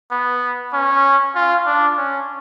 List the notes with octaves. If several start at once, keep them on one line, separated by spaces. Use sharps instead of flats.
B3
C#4
F4
D4
C#4